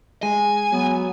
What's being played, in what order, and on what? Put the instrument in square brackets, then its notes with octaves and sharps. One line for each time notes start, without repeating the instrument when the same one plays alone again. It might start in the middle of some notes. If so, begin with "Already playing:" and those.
[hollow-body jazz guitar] G#3 [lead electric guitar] G#5
[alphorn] F#3 [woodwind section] B3